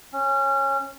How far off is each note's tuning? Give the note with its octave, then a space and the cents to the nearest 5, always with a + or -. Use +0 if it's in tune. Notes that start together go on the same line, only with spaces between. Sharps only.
C#4 -20